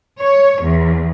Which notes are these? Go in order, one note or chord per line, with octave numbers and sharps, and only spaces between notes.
C#5
E2